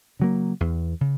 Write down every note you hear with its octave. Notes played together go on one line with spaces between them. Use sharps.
C#3 F#3 A#3
E2
C#3